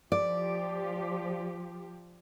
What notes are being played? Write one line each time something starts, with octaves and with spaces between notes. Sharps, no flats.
F3 G4 D5